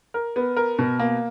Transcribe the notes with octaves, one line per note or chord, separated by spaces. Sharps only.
A#4
B3
A#4
B2
A#3